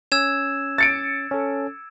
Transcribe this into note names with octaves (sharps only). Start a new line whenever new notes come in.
C#4 E6 G#6 E7
A6 C#7 D7
C#4 A4